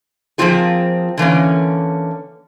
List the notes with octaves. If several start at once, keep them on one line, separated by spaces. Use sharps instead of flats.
F3 F#3 A#3 C4 F4 G#4
D3 E3 A#3 C#4